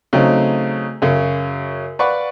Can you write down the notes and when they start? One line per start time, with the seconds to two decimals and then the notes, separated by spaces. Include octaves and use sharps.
0.13 C#3 F#3 A3 C4 D#4
1.02 F#2 C#3 C#5
1.99 B4 D5 F5 F#5 B5 C#6